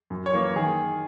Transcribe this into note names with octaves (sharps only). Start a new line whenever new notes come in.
F#2
C#5
E3 A#3
D#3 G#4